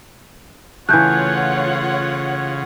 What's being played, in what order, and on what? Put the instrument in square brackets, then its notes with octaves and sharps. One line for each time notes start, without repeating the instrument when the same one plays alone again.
[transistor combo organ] C#3 [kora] E3 A3 [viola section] F4 C#5 F#5 [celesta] F#6 G6